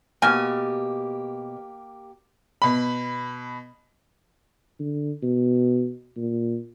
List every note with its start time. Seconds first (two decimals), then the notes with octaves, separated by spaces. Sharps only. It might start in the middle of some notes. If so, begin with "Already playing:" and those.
0.22 B2 A#3 G4 G#5
2.62 B2 B5
4.79 D3
5.23 B2
6.17 A#2